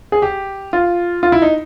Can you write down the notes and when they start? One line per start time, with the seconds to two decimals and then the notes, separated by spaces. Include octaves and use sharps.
0.12 G#4
0.22 G4
0.73 F4
1.23 F4
1.32 E4
1.42 D#4